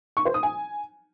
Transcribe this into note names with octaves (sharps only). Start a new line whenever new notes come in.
C#6
C5
D#6
G#5